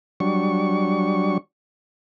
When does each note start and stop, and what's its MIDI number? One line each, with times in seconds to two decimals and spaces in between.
0.20 1.38 54
0.20 1.38 55
0.20 1.38 62
0.20 1.38 85